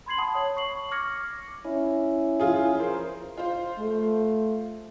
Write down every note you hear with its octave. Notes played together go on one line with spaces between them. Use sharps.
B5 C6 G#6 C7 F#7
F#5 A5 B5 D#6
C#5
C#6 C7 F#7
C#6 D6 F6 G#6 A#6 C#7
C#4 E4
F3 F4 G#4
A#4 C5
F4 C5
A3